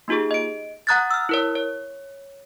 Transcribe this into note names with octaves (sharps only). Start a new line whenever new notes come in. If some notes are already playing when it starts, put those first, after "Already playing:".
A#3 D#4 F4 G4 G#4
D#5 D7
F#5 A#5 D#6 F#6 G#6 A6
E6 F6
E4 A#4 C#5
C#5